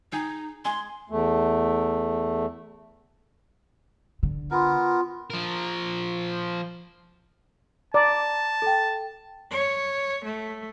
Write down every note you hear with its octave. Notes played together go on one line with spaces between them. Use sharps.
D#4 G#4 G5
G#3 G#4 C6
E2 A3
D3
B3 F4 A#4 C6
F3 A#4
D5 A5 A#5
A4 G5
C#5
A3